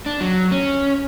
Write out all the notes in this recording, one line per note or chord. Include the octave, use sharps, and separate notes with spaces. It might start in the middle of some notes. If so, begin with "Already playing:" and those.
D4
F#3
C#4